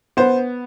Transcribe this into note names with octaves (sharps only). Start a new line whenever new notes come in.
B3 C5